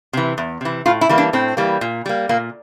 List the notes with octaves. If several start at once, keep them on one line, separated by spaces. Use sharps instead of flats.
C3 E3
E2
C3 E3
A2 F4
E4
E3 G3 A#3
D4
A2 C4
E3 G3 A#3
A#2
G3 A#3
A#2 A#3